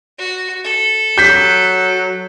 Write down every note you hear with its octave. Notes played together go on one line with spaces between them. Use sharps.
F#4
A4
F#3 G6 B6